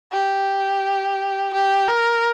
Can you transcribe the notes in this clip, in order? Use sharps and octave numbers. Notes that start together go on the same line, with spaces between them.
G4
G4
A#4